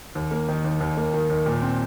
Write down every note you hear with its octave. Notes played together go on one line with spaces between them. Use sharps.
D#2
A#3
D#3
D#2
D#2
A#3
D#3
D#2
A#2
C4